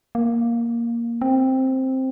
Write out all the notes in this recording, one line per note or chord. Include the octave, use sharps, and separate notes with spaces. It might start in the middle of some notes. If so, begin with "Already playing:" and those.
A#3
C4